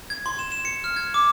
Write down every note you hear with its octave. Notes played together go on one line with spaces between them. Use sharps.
G#6
C6
E7
E7
C#7
F6
G#6
D6